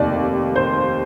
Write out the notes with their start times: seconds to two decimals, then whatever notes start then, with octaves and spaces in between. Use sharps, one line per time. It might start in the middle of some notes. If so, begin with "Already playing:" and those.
Already playing: F1 D#2 D5
0.56 C5